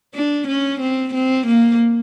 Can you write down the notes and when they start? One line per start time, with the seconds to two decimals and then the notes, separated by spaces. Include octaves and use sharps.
0.14 D4
0.47 C#4
0.80 C4
1.14 C4
1.47 A#3